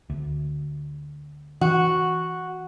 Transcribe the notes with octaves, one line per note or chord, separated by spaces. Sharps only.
D2
E3 F#4